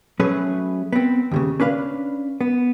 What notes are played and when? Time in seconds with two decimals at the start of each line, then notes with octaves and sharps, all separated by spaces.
0.20 F#3 A3 C#4 G#4 B4
0.93 B3 C4
1.31 D#2 A#2 C#3
1.60 C#4 D4 B4 F5
2.41 B3